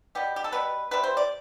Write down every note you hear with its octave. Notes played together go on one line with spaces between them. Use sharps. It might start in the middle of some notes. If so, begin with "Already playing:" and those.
B2 G3 B3 G4
G4
A4
B2 G3 B3 B4
C3 G3 B3 B4
C5
D5